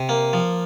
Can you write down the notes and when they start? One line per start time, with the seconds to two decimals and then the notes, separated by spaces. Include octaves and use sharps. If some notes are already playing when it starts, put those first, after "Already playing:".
Already playing: C3
0.09 A#3
0.33 F3